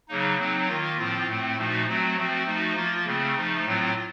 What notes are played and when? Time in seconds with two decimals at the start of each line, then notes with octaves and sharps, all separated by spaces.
0.08 C#3 F#3 A#3 D#4
0.39 F#3 C4 D#4
0.68 D#3 A#3 F4
0.98 A2 F3 C4 F4
1.27 A2 A3 C4
1.56 A#2 F3 A3 D#4 F#4
1.86 F#3 A3 C4 F#4
2.17 F3 A3 C4 F#4
2.46 F3 A3 D#4 F#4
2.76 F3 A#3 F4
3.06 C#3 A3 C4
3.35 F3 A3 D#4
3.65 A2 F#3 C4 F4